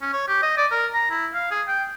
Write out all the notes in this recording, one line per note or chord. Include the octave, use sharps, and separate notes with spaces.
C#4
C#5
G4
D#5
D5
A#4
A#5
E4
F5
G#4
G5